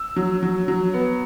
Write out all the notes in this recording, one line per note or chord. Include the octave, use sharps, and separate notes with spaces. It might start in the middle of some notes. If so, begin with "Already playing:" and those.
Already playing: E6
F#3
F#3
F#3
B3